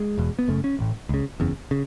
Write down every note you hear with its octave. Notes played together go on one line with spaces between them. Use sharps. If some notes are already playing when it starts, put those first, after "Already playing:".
Already playing: G#3
E1 E2 B2
B3
F#1 F#2 C#3 A3
C#4
A1 A2
C#2 C#3
F#1 E2 C#3
C#3